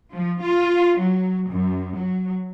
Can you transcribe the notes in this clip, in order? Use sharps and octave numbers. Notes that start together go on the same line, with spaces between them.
F3
F4
F#3
F#2
F#3